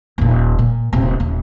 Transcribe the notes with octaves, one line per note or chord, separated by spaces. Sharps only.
D#1 A#2
A#2
D#1 C3
D#1